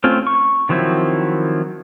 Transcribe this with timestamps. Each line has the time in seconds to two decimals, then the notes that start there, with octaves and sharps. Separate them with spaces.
0.04 A3 C4 C#4 F4
0.27 C#6
0.69 D#3 F3 F#3 C4 E4